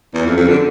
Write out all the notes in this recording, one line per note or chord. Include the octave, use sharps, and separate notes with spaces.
E2
F2
F2
D3